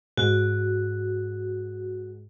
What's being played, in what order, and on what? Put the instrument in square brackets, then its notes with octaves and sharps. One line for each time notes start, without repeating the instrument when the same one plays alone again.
[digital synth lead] G#2 [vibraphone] F#4